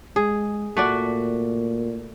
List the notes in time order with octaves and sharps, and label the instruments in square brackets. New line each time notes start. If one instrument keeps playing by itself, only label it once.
[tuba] G#3 [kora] G#4
[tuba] A#2 [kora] A3 F#4 D5